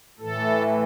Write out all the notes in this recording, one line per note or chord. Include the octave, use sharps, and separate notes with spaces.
A2 E3 A4